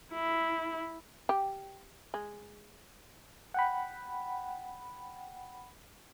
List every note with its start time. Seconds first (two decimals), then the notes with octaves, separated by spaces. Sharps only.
0.13 E4
1.29 G4
2.14 G#3
3.54 F#5 G5 B5